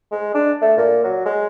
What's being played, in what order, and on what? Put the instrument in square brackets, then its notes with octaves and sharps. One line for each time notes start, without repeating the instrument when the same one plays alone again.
[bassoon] G#3
D4
A3
A#2
F#3
G#3